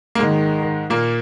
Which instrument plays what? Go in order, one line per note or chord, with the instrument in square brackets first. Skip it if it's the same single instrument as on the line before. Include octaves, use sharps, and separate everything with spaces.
[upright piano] A#3
[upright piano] G#2 G#3 [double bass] D#3
[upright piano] A#2 A#3